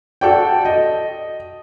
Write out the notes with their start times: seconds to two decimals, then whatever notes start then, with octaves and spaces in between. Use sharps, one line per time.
0.21 F#4 A4 D5 G5
0.65 D#5